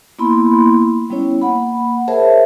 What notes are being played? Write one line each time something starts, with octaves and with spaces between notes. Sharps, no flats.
A#3 B3 E4 B5 C6
G3 B3 C#4 E4 C#5
A#3 F#5 B5
G#4 A#4 C5 C#5 E5 A5